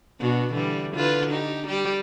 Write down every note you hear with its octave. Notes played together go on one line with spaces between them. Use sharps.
B2 D4 F#4
D3 E3 G3
D3 F4 B4
D#4 G4
G3 G4